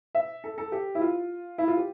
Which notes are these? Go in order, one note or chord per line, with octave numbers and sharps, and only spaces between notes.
E5
A4
A4
G4
E4
F4
E4
F4
G4